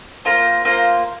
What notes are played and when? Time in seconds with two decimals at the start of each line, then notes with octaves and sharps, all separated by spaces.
0.25 A#3 F4 C5
0.65 A#3 F4 C5